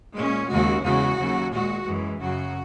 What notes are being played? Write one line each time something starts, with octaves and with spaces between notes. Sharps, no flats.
A#2 G#3 C#4
D#2 C#3 G#3 F#4
E2 C#3 G#3 F#4
D#2 C#3 F#3
A#2 G#3 F#4
F#2 E3 G#3
F#2 C#3 F#3 F#4